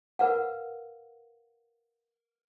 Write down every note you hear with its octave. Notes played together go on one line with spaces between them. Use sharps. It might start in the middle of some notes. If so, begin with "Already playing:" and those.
A#4 B4 F5 F#5